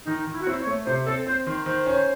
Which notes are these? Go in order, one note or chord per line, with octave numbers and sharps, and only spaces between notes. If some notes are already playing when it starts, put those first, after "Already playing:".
D#3 D#4
D#3
E4
F#4
C4 E4
C#5
A3
C3 C5
C4 A4
C4 C5
D#3 C5
D#3 C5
C#4